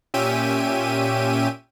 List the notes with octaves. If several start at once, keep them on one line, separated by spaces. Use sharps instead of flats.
A#2 C#4 G4 E5 D#7